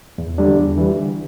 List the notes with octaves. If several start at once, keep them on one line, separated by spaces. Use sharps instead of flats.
E2
D3 G3 D4
E2
E3 G3
D3